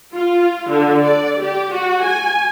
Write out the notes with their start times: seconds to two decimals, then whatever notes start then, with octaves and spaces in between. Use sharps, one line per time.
0.14 F4
0.70 D3
1.05 D5
1.40 G4
1.73 F#4
2.05 G#5